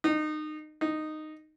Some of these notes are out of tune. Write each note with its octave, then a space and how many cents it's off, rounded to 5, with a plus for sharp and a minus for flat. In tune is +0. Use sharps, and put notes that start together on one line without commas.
D#4 -25
D#4 -10